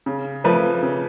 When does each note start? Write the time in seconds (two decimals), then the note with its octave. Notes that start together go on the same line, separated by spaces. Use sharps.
0.06 C#3
0.44 F3 A3 B4
0.83 C#3